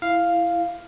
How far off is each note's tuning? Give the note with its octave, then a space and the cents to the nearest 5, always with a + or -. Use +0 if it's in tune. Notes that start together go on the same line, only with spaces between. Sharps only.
E4 +15 F5 +0